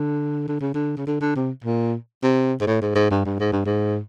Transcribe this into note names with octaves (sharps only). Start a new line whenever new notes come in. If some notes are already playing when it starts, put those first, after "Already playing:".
Already playing: D3
D3
C#3
D3
C#3
D3
D3
C3
A#2
C3
G#2
A2
G#2
G#2
G2
G2
G#2
G2
G#2